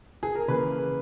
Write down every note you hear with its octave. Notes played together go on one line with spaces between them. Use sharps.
G#4
A#4
C#3 E3 A#3 B4